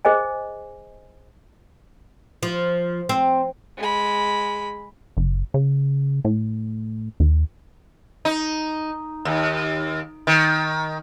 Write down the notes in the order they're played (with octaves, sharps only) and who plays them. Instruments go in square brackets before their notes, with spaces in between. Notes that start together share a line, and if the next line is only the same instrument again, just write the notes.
[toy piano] G#4 C5 D#5 G#5
[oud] F3
C4
[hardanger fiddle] G#3 B5
[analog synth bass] F#1
C#3
A2
D#2
[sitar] D#4
D#2
D#3